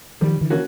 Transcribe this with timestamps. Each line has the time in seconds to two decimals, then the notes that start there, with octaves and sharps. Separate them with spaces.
0.21 D#3 F3 G3
0.41 D3 E3
0.50 A#3 C#4 F#4